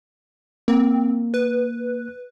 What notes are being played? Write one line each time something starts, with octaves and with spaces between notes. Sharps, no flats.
A#3 C4
B4